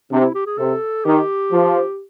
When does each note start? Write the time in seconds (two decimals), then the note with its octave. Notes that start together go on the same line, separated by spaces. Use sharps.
0.11 C3 D4
0.23 E4
0.34 G4
0.46 G#4
0.58 C3 A4
1.05 D#3 G4
1.52 F3